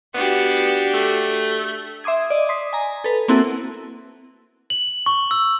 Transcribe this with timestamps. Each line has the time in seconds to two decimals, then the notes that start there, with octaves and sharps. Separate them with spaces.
0.14 B3 D4 F#4 G4
0.94 A3
2.04 E5 C6 D6 D#6 G#6
2.30 D5 D#5
2.49 C6 D#6 B6
2.73 G#5 A#5
3.04 A4 B4
3.28 A#3 C4 E4 F#4 A4
4.70 F#7
5.06 C#6
5.31 E6